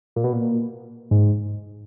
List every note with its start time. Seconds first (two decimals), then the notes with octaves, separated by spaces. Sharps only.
0.16 A#2
0.24 B2
0.33 A#2
1.11 G#2